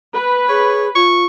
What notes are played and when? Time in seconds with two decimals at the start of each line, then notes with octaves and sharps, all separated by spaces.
0.14 B4
0.49 G#4 C#5
0.95 F4 C#6